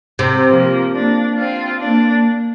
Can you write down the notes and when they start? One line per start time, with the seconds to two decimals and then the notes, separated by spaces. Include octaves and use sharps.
0.19 C3
0.48 F3 A#3
0.93 A#3 D4
1.38 C4 F4
1.82 A#3 D4